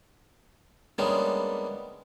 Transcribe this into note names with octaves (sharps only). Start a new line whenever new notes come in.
G3 G#3 A#3 B3 C#4 D4